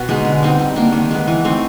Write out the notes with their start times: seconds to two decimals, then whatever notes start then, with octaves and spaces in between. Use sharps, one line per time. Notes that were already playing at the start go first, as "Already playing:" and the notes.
Already playing: B2
0.09 G#3 B3 D#4
0.25 D3
0.43 G3 C4 D#4
0.60 G3
0.76 A#3 D4
0.92 D#3
1.11 G#3 B3
1.27 E3
1.44 A3 C4 D#4